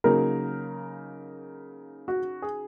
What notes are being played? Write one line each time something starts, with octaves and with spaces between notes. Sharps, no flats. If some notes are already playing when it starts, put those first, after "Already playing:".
C#3 F#3 A#3 D#4 A#4
F#4
G#4